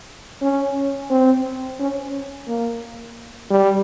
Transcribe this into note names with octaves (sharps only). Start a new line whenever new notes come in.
C#4
C4
C#4
A#3
G3